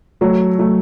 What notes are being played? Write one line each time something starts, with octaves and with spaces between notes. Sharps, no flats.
F#3 A3
F#3 A3